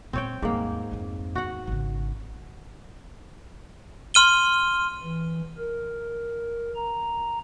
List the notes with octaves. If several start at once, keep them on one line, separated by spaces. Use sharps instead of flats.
A#2 G#3 C4 C#5 G5
D#2 G#2 G3 A#3
F2 C4
D#2 F#4 F#5
G#1 C#3
C6 F6 D#7 G7
E3
A#4
A#5